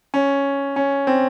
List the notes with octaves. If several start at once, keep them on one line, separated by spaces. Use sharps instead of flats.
C#4
C#4
C4